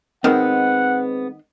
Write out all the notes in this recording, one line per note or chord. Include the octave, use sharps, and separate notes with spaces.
D#3 G#3 B3 C4 F#5